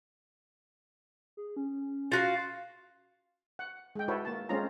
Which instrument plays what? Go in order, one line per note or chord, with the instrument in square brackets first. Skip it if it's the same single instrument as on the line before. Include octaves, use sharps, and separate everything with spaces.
[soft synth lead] G#4
C#4
[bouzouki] F4 F#4 F5
[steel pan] F#5
G#3 G5
E4 F#4 A4 B4 C#5
A#3 A5
G#3 A3 C4 C#4 F4 A#5